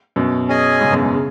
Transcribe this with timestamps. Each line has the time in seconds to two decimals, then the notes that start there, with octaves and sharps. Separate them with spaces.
0.16 F#2 B2
0.48 C#4 G#4 D#5 G#5
0.80 G#2 C#3
0.92 F#2 B2
1.03 G#2
1.13 C#3